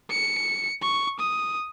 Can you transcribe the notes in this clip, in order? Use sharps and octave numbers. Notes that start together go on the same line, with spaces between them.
C#7
C#6
D#6